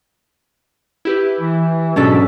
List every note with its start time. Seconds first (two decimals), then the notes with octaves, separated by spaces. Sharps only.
1.05 E4 G4 B4
1.40 E3
1.96 G#2 B2 F#3 C#4 D4 A4 B6